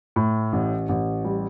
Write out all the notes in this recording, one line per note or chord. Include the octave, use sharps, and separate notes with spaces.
A2
A1
A1
G3